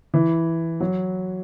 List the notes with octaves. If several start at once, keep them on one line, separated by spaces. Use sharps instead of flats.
E3
F#3